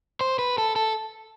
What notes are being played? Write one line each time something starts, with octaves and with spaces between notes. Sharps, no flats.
C5
B4
A4
A4